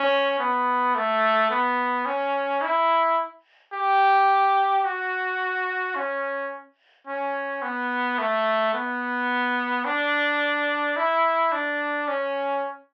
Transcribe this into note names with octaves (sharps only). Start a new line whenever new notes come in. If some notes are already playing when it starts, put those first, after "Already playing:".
Already playing: C#4
B3
A3
B3
C#4
E4
G4
F#4
C#4
C#4
B3
A3
B3
D4
E4
D4
C#4